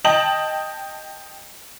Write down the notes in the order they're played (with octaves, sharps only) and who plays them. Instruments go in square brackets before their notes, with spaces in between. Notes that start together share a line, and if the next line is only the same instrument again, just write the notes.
[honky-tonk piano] D#5 G5 A5 F#7